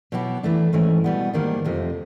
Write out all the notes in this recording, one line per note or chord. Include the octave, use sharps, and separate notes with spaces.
B2 F#3 B3 E4 G4
E3 A3 D4
G#2 E3 A3 C#4
B2 G3 B3
G#2 D#3 G3 A#3 D4
F2 C3 F3 A3